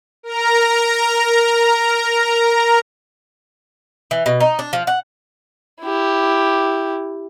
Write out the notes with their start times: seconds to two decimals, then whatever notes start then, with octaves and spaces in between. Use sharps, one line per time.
0.23 A#4 A#5
4.11 E3
4.26 B2
4.40 D#4
4.59 D4
4.73 F3
4.87 F#5
5.82 E4 G4